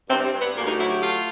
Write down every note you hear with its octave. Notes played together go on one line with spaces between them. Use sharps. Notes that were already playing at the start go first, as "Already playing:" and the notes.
G2 C4
C4
G2
B3
D2 A#3
D#4
F#3 E4
G4
A3 F4